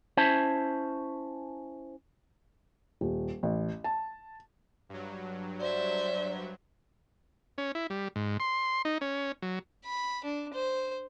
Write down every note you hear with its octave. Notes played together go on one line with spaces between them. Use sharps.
C#4 E4 C5 E5 A5
D#1
A1
A5
G2 F#3
C5 D5 E5
C#4
E4
G3
G#2
C6
D#4
C#4
F#3
B5
D4
C5